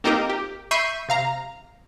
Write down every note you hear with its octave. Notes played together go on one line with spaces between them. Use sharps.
A#3 C4 D#4 F4 G4 A#4
G4
E5 B5 C#6 G6 C7 D#7
C3 F5 A#5